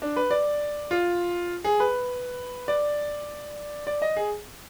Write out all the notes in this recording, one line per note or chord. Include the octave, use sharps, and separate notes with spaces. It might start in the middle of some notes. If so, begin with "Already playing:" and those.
D4
B4
D5
F4
G#4
B4
D5
D5
D#5
G#4